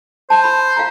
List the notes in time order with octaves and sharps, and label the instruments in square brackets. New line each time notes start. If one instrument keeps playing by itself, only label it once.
[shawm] C5 [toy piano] A5
[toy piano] B5
F5 A#5